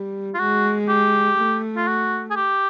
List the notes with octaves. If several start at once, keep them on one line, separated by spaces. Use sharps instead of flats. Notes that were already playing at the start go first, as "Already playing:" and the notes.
Already playing: G3
F4
G#3 F#4
G4
A3
F4
F#4
G#4
G4